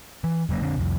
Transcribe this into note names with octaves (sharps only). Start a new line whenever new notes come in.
E3
E1 C#3 F#3 A#3
F2 D3 C4 D4
C2 F2